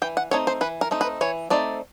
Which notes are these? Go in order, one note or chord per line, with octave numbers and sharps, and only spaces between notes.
E3 G5
F#5
A3 C4 D#4 C#5
C5
E3 B4
A#4
A3 C4 D#4
B4
E3 C#5
A3 C4 D#4 D5